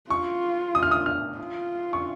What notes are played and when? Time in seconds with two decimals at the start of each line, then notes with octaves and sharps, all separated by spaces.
0.10 F4 C#6
0.75 D#6
0.83 F6
0.91 D#6
1.06 F6
1.38 F4
1.93 C#6